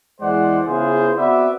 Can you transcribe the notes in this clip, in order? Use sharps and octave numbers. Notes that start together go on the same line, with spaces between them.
E2 E3 G#3 C5 D5 F#5
C#3 B3 E4 F4 G#4 C5
B3 C4 F#4 B4 D5 E5